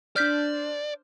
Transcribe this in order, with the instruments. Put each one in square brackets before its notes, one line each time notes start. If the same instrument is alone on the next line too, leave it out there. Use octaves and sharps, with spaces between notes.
[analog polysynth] D4 C5 [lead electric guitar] D5 [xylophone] F6 G6 B6